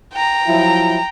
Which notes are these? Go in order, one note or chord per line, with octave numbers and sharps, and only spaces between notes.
G5 A#5
F3 F#3 E4